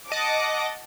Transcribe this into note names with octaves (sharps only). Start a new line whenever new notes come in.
D#5 F#5 A5 D6